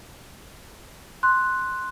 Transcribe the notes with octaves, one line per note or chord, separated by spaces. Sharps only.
C6 F#6